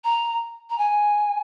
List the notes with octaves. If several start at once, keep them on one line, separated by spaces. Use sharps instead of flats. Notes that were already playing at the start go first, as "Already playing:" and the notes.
A#5
A#5
G#5